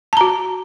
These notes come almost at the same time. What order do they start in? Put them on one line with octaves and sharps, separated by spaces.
A5 A#5 F#4